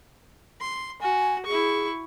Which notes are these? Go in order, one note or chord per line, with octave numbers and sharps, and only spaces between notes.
C6
F#4 G#5
E4 G#4 C#6